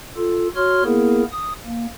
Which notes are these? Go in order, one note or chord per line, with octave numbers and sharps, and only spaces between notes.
F4 A4
F#4 C#5 C6 F6
A#3 B3 E4 G#4 A#4
D#6
A#3